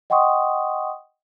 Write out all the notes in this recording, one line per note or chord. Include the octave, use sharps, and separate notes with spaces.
D#5 F#5 G5 C6 C#6 D#6